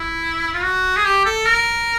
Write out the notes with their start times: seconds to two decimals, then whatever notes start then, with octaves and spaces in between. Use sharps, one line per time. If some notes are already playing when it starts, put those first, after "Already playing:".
Already playing: E4
0.54 F4
0.64 F#4
0.97 G#4
1.05 G4
1.25 A4
1.47 A#4